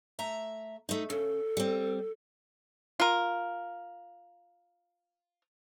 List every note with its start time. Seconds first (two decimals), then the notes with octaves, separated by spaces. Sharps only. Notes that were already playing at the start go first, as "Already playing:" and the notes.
0.19 A3 E5 A#5
0.89 A3 D#4
1.10 C#3 A4
1.57 G3 C4
3.00 F4 A#4